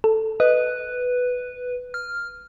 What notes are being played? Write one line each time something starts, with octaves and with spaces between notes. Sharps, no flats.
A4
B4 D#5
F6